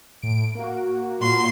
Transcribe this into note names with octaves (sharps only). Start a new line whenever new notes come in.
A2 D7
A#3 F#4
A#2 C6